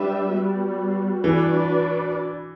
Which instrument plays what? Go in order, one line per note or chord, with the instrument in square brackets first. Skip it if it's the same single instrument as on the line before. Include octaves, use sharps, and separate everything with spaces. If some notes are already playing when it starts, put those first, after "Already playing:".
Already playing: [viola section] G3 D4 G4 B4 E5
G3 B3 F#4
[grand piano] E3 [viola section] D4 F#4 B4 D5